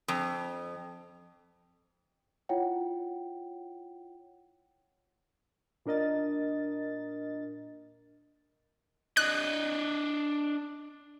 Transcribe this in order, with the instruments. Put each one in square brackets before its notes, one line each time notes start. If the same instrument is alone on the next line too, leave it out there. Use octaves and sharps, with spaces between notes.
[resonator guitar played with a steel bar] F2
[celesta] E4 F4 C#5 F#5 G5
[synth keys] A#2 D4 A#4 D#5 A6
[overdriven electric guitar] D4 D#5 [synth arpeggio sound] F#6